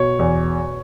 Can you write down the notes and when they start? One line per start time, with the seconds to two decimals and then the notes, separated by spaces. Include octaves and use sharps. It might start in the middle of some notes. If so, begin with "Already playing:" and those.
Already playing: B2 C#5
0.19 E2